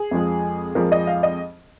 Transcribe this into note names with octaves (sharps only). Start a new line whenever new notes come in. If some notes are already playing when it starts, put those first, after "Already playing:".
Already playing: G#4
F2 F3 G#3
F2 F3 G#3 A#4
D#5
F5
D#5